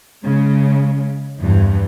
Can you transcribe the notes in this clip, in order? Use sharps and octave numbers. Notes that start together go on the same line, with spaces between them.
C#3 G#3
E2 G2 E3 F3